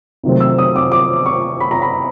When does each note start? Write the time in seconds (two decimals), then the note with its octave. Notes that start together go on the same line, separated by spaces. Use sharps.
0.23 C3 D#3 F#3 A3 C4
0.40 E6
0.59 D#6
0.76 D6
0.92 D6
1.26 C#6
1.60 B5
1.71 A#5
1.82 B5